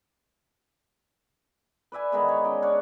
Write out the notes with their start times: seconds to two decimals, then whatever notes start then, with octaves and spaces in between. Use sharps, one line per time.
1.92 B4 D5 E5 G#5
2.12 D#3 E3 G#3 B3
2.29 C#5
2.44 C#4 D#4 D5 D#5
2.62 D4 C#5 F5 F#5